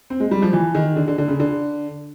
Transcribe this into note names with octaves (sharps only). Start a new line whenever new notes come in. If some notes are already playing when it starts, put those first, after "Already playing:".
C4
G#3
G3
F3
E3
D#3
D3
D3
D3
C#3
D3